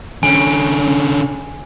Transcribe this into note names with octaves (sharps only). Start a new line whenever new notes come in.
D3 C#4 G#5